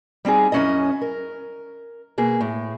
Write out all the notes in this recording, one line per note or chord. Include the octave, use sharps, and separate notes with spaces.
G3 C4 D#4 G#4
F#2 D#3 C#4 E4 D#5
A#4
B2 A#3 G#4
A2